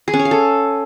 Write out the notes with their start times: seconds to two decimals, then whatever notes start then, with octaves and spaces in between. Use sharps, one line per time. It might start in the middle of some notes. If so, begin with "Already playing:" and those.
0.08 G#4
0.13 C#4
0.19 C#5
0.25 F5
0.31 A4